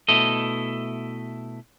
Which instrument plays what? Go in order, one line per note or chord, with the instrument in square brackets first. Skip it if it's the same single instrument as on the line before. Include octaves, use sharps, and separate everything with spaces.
[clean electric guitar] B2 A3 E4 A4 D#5